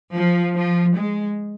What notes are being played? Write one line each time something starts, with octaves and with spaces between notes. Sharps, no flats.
F3
F3
G#3